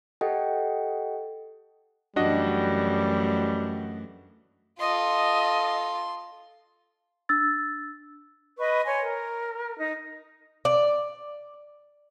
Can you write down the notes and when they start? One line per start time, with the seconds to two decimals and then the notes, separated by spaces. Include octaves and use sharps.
0.21 G4 A4 D#5 F#5 G5
2.16 F#2 E3 G3 A3 D4 F#4 D#5
4.80 F4 A4 D#5 C6
7.29 D4 E6 A6
8.58 B4 D#5 B5 C#6
8.84 C#5 G#5 C6
9.02 A#4
9.77 D#4
10.65 D5